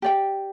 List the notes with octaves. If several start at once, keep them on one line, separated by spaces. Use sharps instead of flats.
G4 D5 G5